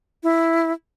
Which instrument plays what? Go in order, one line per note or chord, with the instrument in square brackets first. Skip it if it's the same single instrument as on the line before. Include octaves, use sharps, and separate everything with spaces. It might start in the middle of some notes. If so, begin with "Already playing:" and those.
[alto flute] E4